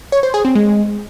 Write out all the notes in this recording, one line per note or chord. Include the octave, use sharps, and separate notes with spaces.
C#5
C5
G#4
C4
G#3